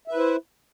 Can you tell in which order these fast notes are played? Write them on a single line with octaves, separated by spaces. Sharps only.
E5 B4 E4 C5